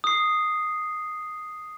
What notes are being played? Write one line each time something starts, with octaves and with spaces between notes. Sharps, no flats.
D#6 C7